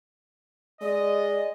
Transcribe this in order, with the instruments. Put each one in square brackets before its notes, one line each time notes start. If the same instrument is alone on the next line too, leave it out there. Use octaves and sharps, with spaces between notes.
[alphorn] G#3 [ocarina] D5 [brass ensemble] D#5